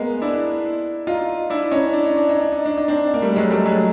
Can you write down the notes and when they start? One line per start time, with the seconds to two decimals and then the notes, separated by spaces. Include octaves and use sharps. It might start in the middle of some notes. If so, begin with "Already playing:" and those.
Already playing: G#3 A#3 B3
0.22 D4 E4
1.07 D#4 F4
1.50 D4 E4
1.71 C#4 D#4
1.93 D4
2.05 D#4
2.17 D4
2.29 D#4
2.40 D4
2.52 D#4
2.66 D4
2.77 D#4
2.88 C4 D4
3.14 A#3
3.22 G3 A3
3.36 F#3 G#3
3.51 G3 A3
3.65 F#3 G#3